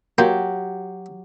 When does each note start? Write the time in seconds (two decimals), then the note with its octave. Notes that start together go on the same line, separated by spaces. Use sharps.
0.18 F#3 A#3 G4 G5 C6